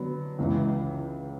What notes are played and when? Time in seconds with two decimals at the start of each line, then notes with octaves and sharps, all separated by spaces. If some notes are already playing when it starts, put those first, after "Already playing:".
Already playing: D3 F#3 B3
0.39 C#2 C#3 E3